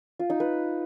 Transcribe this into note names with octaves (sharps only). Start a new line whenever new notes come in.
F4
D#4
B4